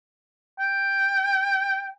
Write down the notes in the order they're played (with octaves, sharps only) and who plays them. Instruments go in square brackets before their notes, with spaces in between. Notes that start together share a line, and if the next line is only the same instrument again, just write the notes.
[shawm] G5